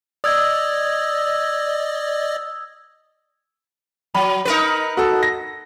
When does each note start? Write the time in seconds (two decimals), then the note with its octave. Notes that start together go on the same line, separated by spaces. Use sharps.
0.24 D5 D#5 D#6 E6 G#6
4.15 F#3 B5
4.45 D#4 A#4 B4
4.97 F#4 A4
5.23 A#6